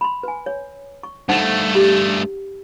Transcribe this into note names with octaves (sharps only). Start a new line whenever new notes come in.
B5 C6
B4 G#5
C#5
C#6
G2 A3 D#4 C5 F#5
G4